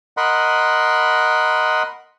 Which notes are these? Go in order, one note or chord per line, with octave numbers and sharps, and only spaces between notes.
A#4 D#5 F#5 B5 C6